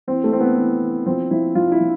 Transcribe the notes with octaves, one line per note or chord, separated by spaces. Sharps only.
E3 C4
A3
E3 C4
B3
E3
E3
F3 C4
F3 E4
F3 F4
E4
F3